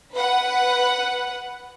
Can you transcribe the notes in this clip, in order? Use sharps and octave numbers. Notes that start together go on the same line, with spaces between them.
B4 F#5